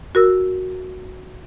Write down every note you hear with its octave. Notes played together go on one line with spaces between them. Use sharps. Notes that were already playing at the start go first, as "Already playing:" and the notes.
F#4 A#4 E6